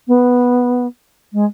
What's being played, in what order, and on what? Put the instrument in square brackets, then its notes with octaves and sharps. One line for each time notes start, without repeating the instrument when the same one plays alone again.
[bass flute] B3
G#3